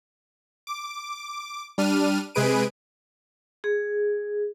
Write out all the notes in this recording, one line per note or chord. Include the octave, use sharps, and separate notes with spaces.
D6
G3 D4 F6 D#7
C3 G#3 G#4 B4 D7 D#7
G#4